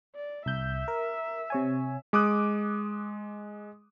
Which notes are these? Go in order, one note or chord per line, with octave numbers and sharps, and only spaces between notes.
D5
C2 E5 G6
A#4
C3 C#5 G#5
G#3 D6 D#6 F#6